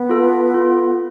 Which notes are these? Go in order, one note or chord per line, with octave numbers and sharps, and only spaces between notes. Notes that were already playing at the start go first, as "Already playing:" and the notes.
Already playing: B3
F4 A4
F4